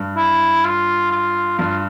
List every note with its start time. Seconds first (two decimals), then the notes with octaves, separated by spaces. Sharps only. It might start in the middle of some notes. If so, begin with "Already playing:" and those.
Already playing: G2
0.17 E4
0.65 F4
1.11 F4
1.59 G2 F4